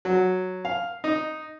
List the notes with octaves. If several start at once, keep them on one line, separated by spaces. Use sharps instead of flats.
F#3
F5
D#4